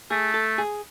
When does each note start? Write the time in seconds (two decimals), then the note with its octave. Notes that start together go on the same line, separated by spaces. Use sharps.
0.11 A3 G#4
0.34 A4
0.58 G#4